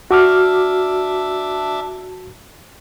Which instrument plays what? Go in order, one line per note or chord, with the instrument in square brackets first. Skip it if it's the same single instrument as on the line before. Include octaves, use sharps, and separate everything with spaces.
[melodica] D4 E5 [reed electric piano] F#4 D6 F6